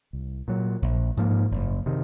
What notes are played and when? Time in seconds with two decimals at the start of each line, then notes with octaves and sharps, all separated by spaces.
0.13 C2
0.48 A#2 F#3
0.82 A#1
1.17 G#2 F3 A#3
1.51 F#1
1.86 C3 D#3